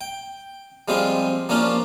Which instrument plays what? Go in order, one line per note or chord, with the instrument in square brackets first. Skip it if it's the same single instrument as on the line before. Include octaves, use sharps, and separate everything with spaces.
[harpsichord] G5
F3 G3 G#3 C4 F4
F3 A#3 C#4 D4 F4